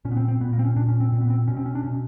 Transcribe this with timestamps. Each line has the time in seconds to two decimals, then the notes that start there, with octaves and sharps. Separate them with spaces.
0.05 A#2 C#4
0.11 B3
0.17 C4
0.28 C4
0.40 A#2 B3
0.53 A#3
0.59 C4
0.65 C#4
0.76 A#2 D4
0.88 C#4
1.00 C4
1.12 A#2 C4
1.21 B3
1.30 C4
1.48 B2 C#4
1.57 C4
1.66 C#4
1.75 D4
1.83 B2 C#4